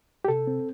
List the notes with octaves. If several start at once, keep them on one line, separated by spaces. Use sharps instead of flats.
G4
C3 A4
C4